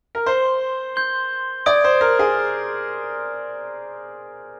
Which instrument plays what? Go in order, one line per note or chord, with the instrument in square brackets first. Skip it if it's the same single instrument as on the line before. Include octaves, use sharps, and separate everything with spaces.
[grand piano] A#4
[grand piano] C5 [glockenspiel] C6 G6 C7 G7
[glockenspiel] C6 G6 C7 G7
[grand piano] D5 [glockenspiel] D#6 G#6 D7
[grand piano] C5
A#4
G#4